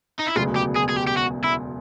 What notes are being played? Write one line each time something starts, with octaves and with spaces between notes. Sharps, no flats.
D#4
E4
E1 D2 C#3 F#3 B3 F4
G4
G#4
G#4
G4
G4
F#4
E4